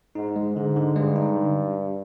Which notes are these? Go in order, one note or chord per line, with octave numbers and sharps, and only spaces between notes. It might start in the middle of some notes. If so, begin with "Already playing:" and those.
G#2 D#4
G#3
G#2 D3
D3
G2 G#3
D#4
D3